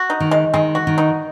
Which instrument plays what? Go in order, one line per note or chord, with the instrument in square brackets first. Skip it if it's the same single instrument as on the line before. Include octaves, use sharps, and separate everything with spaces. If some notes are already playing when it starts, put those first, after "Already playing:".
Already playing: [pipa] F#4
D#4
[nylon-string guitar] D#3
[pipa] G#3
[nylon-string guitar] D#3 [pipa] G#3
[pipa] F#4
[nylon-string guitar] D#3
[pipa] D#4